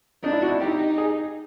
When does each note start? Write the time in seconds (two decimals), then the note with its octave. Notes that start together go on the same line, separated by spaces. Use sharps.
0.23 D4 D#4
0.32 E4
0.42 F#4
0.52 E4
0.61 D#4 G4
0.98 G#4